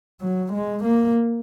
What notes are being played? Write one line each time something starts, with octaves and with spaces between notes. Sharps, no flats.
F#3
G#3
A#3